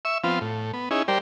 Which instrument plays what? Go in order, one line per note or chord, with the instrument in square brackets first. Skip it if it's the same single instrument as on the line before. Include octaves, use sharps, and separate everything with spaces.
[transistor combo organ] E5 C#6 E6
F3 B3 C4 F4
A2
B3
C#4 D#4 E4 G#4
G3 G4 A#4 C5 D5